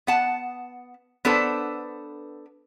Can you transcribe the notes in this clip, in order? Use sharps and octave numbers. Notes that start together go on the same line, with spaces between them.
B3 F#5 A5
B3 D4 A4 B4 C5